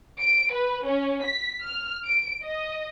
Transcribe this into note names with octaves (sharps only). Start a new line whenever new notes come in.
D7
B4
C#4
B6
F6
D7
D#5